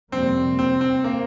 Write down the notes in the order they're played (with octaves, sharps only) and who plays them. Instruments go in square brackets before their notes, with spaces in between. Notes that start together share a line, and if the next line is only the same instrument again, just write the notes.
[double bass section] F2 C3 G3 A#3 [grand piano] C4
[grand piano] C4
C4
A#3